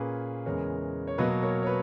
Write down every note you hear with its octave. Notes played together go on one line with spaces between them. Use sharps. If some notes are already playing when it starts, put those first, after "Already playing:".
Already playing: A#2 A#3 C#4 G#4 B4
E2 C#3 G#3 B3 A#4 C#5
C#5
B2 F#3 A#3 B4 D#5
A#4 C#5
C#5
B4